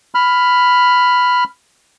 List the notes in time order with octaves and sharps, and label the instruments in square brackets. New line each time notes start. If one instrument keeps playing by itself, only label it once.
[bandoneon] B5 F6